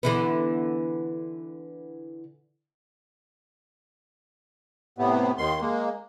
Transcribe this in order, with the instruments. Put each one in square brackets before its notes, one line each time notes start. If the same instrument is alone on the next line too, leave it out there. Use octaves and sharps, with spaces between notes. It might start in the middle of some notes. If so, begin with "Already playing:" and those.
[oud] D3 E3 B3
[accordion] A2 C3 B3
D#2 D#3 C6
G#3 A#3